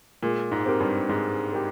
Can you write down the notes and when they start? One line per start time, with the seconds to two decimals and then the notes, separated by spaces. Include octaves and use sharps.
0.22 A#2 G#3
0.52 G#2
0.66 C4 G4 A#4
0.80 G2
1.09 G#2 G#3
1.53 G4 A#4